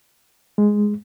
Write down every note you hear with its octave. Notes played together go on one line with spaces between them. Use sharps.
G#3